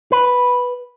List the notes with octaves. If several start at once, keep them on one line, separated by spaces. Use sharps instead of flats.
B4